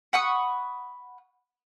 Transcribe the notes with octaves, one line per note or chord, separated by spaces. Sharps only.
F#5 B5 C#6 D#6